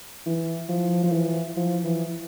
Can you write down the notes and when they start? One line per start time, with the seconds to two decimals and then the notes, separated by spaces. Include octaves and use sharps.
0.26 E3
0.69 F3
1.04 F3
1.12 E3
1.56 F3
1.84 E3